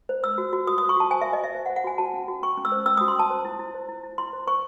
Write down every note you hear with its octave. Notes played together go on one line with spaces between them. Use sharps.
C5
C5 E6
F#4
F#4
F#4 D#6
D#6
C5
C#6
F#4 A5
C5 G#5
E5
F#4
D#5
F#4 E5
C5 E5
F#5
C5
F#5
F#4 G#5
F#4 A5
C#4
F#4
C#4 C#6
C#4
E6
C5
C#4 E6
D#6
F#4
C6
C#4 A5
C5
E4
E4
C5
E4
E4
E4 C6
C5
C5 C#6